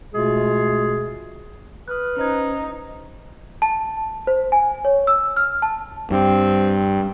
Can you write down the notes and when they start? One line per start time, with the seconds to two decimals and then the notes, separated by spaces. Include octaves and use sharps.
0.14 B2 G#3 A3 F4 G#4
1.88 B4 D#6 F6 F#6
2.17 C#4 D#4 C5 G#6
3.62 A5
4.27 C5
4.52 G#5
4.85 C#5
5.07 E6
5.37 F6
5.62 A5
6.11 G2 C4